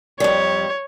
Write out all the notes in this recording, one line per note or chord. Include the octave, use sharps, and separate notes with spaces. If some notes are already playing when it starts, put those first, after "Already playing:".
F2 G3 C#5